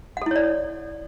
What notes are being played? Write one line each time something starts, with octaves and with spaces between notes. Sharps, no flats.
E4 A4 C#5 D5 F#5